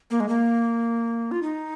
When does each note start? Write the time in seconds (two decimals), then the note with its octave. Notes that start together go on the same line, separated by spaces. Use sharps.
0.11 A#3
0.20 G#3
0.29 A#3
1.31 F4
1.43 D#4